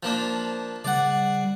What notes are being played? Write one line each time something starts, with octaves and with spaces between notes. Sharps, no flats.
F3 A#3 D4
C#3 G3 D5 F#5